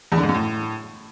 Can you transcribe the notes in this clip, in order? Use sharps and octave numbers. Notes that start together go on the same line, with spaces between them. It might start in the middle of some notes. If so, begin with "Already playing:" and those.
E2
D3
G#2
F#2
A2